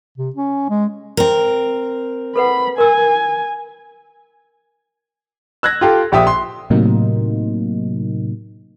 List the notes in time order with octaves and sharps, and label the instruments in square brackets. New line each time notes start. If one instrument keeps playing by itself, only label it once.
[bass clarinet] C3
C#4
G#3
[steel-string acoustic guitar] C4 A#4
[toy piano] A4 B4 F#5 [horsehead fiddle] B5
[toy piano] A#4 E6 [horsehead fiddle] G#5
[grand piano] E6 F#6 G#6 A#6
F4 G4 A4
A#1 G4 E5 D#6
C6
[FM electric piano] A2 C3 F#3 A#3 D#4